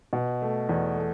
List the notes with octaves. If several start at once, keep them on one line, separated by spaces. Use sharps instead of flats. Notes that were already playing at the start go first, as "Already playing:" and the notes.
B2
A3
E2
A3